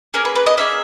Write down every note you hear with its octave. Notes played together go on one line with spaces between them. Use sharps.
A#3 C#4 G#4 A#4
B4
B4
D#5
A#3 C#4 G#4 E5